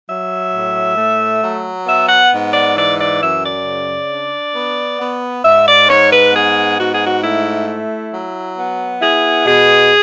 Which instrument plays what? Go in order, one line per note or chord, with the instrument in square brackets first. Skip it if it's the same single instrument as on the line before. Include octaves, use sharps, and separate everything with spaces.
[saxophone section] F#3 E5
A2
A3
F#3
B3 E5
F#5
G#2
D5
E3 D5
D5
F#2 E5
D5
C#3
D4
B3
B3
G#2 E5
D5
G#2 C#5
B4
B3 G#4
G#2 F#4
G#4
F#4
A3 E4
E4
F#3
B3
E4 G#4
B2 G#4